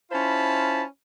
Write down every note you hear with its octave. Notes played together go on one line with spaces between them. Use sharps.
C#4 E4 F4 C5 A5 B5